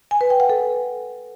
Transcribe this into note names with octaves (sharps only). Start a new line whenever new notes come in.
G#5
B4
G5
F#5
A4